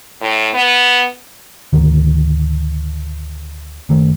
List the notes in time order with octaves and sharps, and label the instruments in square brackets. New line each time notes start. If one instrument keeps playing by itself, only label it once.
[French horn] A2
B3
[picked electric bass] D2 G#2 D3 D#3
F#1 D#3 A3